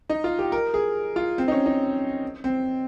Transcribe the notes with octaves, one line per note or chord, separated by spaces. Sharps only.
D#4
F4
G4
A#4
G#4
F4
C4
D#4
C#4
D#4
C4